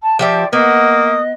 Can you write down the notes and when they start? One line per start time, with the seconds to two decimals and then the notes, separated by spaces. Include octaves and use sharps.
0.02 A5
0.19 F3 G4 D5 E5
0.53 A#3 B3 D#5 D#6